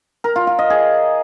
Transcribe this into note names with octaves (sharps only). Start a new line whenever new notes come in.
A#4
F4
F4
D#5
G#4